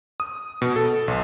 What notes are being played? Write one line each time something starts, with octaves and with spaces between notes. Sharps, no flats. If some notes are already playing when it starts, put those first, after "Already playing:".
D#6
B2
A4
B1